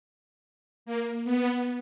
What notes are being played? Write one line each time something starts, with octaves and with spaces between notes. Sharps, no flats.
A#3
B3